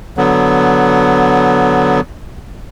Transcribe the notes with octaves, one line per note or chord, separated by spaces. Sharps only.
D3 F#3 B3